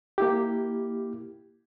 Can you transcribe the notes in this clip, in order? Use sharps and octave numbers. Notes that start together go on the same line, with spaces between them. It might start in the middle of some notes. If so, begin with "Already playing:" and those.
A#3 E4 G4